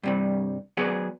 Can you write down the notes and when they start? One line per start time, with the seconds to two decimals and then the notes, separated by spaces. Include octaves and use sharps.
0.03 G2 C3 G3
0.77 F#3 B3 G#4 D5